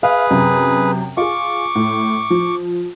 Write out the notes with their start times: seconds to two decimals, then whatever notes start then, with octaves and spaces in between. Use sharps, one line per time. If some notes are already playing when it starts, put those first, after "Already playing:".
0.03 G#4 B4 E5 F5
0.31 F#2 C3
1.17 F4 G#4 C#6 D6
1.75 A2
2.30 F3